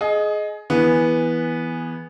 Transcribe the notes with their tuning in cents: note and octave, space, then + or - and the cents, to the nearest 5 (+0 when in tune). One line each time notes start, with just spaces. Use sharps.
G#4 +25 D#5 +0
E3 +0 B3 -10 G#4 -5